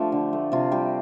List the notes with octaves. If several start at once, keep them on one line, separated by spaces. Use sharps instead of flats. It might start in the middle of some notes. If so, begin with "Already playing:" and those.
Already playing: F3 A3 D4 F4 G4
D3
A3
C3 F4
G3 G4